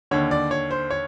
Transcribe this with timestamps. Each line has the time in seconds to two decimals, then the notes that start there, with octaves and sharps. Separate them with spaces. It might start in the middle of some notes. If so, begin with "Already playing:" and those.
0.11 D#2 D3 C#5
0.31 D5
0.51 C#5
0.71 C5
0.90 C#5